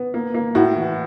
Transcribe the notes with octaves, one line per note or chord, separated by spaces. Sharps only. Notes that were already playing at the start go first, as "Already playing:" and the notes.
Already playing: B3
A#3
A#3
A2 F#4
E3